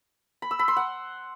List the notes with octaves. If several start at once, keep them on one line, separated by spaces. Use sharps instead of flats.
B5
E6
B5
C6
F#5